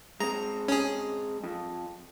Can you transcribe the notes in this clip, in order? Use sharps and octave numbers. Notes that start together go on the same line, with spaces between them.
G#3 C4 A#5
C#4 G#4
F2